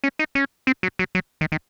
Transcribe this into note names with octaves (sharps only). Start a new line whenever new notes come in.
C#4
D#4
C#4
C4
F#3
F#3
F#3
D#3
D#3